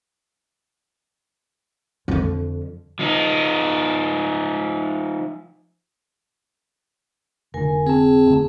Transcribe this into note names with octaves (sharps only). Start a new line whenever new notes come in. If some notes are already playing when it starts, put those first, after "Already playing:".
F2 D3
F3 D#4
F1 D3 A#4 G#5
C4 G#4 A5
F1 D2